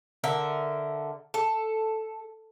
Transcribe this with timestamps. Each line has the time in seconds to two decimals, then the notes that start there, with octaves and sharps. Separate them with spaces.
0.24 D3 A#4 E5
1.34 A4